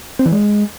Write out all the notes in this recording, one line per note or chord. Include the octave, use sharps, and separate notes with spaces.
C4
E3
G#3